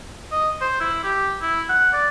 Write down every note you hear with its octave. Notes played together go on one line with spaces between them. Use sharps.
D#5
C5
E4
G4
E4
F#5
D5